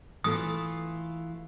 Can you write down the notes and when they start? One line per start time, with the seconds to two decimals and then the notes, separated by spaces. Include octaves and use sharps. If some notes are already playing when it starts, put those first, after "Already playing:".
0.24 E3 A3 F4 D#6